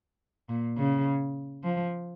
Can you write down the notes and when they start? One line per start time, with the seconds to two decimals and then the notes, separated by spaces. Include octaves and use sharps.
0.49 A#2
0.78 C#3
1.64 F3